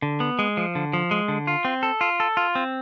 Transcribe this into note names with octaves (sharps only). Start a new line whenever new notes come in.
D3
B3
G#3
F3
D3
F3
G#3
D3
F4
C4
A4
F4
A4
F4
C4